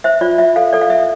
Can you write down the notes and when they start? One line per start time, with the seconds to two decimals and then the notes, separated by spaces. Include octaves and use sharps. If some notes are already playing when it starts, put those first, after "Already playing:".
0.04 C5 E5
0.21 F4 D5
0.38 F4 E5
0.56 A4 F5
0.73 A4 D5
0.81 F5
0.90 A4 E5